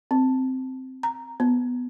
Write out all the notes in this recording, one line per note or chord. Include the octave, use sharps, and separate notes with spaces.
C4
A#5
B3